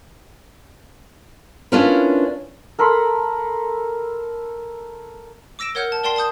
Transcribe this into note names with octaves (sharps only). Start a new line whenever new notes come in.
C#4 D4 E4 F4 A#4 B4
A4 A#4 B5 C6
D6 E6 A#6 D7 E7
A#4 C#5 F#5 F6 G6
A5
A#4 D5 G5 A5 C6 C7
A5 C6 D#6 G6